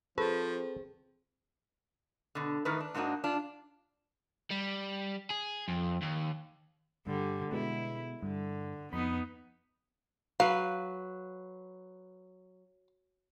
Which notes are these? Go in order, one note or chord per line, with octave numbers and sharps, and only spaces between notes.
F3 C4 G#4 A4 B4
B2 D3
A2 D#3 E3 D#4 A#4 B4
D4
G#2 F#3 A#3 D4 D#4 F#4
D4 F4
G3
G#4
F2
D#2
G2 D3 G3
B2 G#3 B3 E4
G2 D3
F2 B3 D#4 B5
F#3 B4 F5